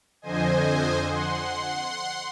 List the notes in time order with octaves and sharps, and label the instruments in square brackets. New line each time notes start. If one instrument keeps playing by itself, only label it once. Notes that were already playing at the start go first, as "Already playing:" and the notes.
[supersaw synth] F2 D3 C5 D#5 G#5
F#5 C6